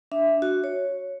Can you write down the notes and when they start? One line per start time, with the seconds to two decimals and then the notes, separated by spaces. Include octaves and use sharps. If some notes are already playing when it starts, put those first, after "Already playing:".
0.12 D4 E5
0.42 F#4
0.64 C#5